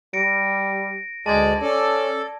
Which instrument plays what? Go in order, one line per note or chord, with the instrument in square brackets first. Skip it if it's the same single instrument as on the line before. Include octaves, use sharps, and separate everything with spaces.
[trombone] G3 [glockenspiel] A#6 C#7 D7
[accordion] D2 D5 [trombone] G#3 [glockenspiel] A5 G#6
[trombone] C#4 [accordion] A4 [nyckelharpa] D5